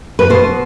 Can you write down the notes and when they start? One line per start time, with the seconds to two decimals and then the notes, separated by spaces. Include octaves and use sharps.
0.19 B4
0.30 B2 C5